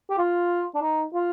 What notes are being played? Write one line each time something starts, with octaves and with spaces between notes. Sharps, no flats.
G4
F4
D4
D#4
F4